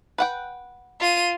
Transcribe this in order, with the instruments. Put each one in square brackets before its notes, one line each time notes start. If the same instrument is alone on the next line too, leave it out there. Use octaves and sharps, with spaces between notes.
[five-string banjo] B4 F#5 G5
[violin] F4 D#7